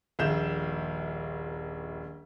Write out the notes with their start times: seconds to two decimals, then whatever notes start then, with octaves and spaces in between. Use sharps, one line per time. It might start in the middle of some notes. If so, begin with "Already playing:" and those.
0.19 D#1 A#1 F5 G6 E7